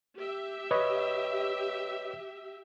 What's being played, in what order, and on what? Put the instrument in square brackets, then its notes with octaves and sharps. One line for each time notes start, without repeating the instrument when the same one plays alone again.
[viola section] G4 E5
[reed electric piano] B4 C#5 D#5